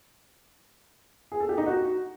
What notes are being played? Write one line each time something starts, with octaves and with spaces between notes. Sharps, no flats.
G#4
A4
G4
D#4
F#4